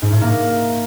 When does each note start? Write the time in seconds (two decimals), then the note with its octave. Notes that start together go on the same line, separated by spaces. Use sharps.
0.02 G#2
0.12 A2
0.22 A#3